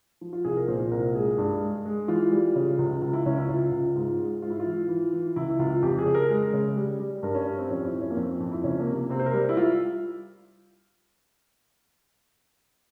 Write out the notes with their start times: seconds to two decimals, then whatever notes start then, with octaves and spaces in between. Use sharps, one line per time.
0.21 F3
0.33 F4
0.45 C2 G#4
0.57 A#4
0.68 A#2 C5
0.91 C2 A#4
1.15 G#3 G#4
1.38 G2
1.62 G#3
1.86 G#3
2.08 E3 F4
2.32 G3
2.56 C#3
2.79 C#2
3.02 C#2 F4
3.13 E4
3.26 C#2 C#4
3.37 E4
3.49 C#2 F4
3.72 C#2
3.96 G#2
4.20 G#3
4.42 G#2 F4
4.50 E4
4.60 F4
4.66 E3
4.89 E3
5.13 E3
5.36 C#2 E4
5.59 C#2 F4
5.82 F2 G4
5.99 G#4
6.06 C#3
6.15 A#4
6.30 G#3
6.53 C#3
6.77 G3
7.00 G3
7.23 G2 A#4
7.35 C#4
7.46 G3
7.59 C4
7.70 F2 C#4
7.85 E4
7.94 F2
8.02 C#4
8.11 A#3
8.17 F2 C4
8.40 F2
8.51 E4
8.64 C#2 C#4
8.80 A#3
8.87 C3
8.94 A#3
9.10 C3 C4
9.20 C5
9.26 A#4
9.34 G3
9.49 E4
9.57 G3 F4